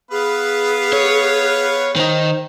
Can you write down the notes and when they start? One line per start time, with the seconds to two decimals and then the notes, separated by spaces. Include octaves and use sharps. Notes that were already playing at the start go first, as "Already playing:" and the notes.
0.11 B3 G#4 B4 F5
0.93 C#5
1.96 D#3 D#4 C5